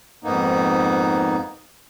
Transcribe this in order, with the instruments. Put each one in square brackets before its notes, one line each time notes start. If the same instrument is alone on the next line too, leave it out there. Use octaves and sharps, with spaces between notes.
[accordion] F2 G#2 A#3 B3 D#4